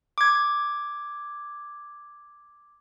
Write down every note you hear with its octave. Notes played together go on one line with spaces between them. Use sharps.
D6 G#6